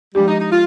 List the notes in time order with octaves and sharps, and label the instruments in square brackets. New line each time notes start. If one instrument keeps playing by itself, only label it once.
[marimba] F3 G#3 D4 G4 [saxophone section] G3
[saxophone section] D#4
D#4
F4